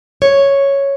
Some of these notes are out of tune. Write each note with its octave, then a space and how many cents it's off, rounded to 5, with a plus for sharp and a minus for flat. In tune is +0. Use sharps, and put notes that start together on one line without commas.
C#5 +0